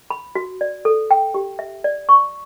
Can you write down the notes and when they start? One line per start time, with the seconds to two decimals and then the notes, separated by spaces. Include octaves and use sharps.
0.10 B5
0.35 F#4
0.61 D5
0.85 A4
1.11 G5
1.34 G4
1.59 E5
1.84 D5
2.09 C#6